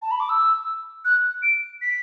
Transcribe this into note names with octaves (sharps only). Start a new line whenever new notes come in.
A5
B5
D6
E6
F#6
D7
B6